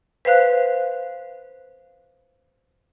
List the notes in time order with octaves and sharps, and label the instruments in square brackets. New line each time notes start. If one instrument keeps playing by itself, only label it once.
[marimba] B4 C5 F5 F#6